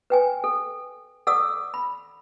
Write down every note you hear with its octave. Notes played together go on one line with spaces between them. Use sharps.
B4 G5 G#5
A4
A4 D5 F#5 D6 E6
B5